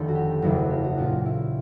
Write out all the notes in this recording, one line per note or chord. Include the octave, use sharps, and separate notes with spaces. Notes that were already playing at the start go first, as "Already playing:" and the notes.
Already playing: F1 D#2 D3 A4 C5
F#4
G4
F#1 E2 C#3 E3 F#4
G4
F#4
A#1 A#2 F4
E4